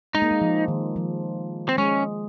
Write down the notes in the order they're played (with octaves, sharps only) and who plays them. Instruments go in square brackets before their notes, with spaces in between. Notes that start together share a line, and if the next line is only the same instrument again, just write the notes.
[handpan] G#3 [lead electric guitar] D#4
[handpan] A#3
G#3
F3
D#3
F3
[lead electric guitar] C4
[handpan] G#3 [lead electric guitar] C#4